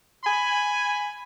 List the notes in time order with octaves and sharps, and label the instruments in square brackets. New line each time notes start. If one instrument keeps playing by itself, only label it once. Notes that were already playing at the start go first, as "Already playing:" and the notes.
[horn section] G#5 B5